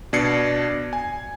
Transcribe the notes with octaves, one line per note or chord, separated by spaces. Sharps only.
B2 D4 D5 G#6 C7 C#7
G#5